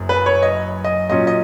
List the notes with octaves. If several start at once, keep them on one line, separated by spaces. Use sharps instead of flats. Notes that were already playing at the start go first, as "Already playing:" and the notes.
Already playing: F#1 F#2
B4
C#5
D#5
D#5
A#2 F#3 C#4 F4 D#5
D#5